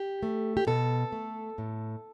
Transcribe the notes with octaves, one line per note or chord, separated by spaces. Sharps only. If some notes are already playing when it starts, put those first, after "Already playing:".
Already playing: G4
A3
G4
B2 A4
A3
A2